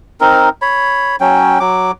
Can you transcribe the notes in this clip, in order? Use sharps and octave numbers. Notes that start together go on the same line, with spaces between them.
C4 D#4 A#4
C#5 B5
F#3 C#4 G5
F#3 D6